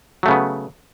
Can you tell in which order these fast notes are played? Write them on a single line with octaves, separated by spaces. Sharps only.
F#3 A3 C#3 B3